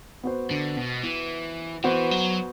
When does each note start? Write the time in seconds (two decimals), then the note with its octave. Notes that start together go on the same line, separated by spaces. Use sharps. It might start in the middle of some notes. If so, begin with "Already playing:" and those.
0.24 B3 F#4 C5
0.51 D3
0.77 B2
1.04 E3
1.84 E3 B3 F#4 C5
2.11 F#3